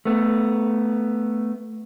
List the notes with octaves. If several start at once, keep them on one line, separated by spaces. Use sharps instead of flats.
A3 B3